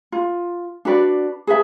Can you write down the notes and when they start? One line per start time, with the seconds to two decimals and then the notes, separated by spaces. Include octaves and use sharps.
0.12 F4
0.85 D4 F#4 B4 D5
1.47 G#4 B4 E5 A5